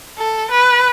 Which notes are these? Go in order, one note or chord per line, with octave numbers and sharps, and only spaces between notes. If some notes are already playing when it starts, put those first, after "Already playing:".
A4
B4